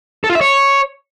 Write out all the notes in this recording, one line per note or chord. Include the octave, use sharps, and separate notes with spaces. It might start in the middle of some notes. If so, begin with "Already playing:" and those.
A4
F4
E5
C#5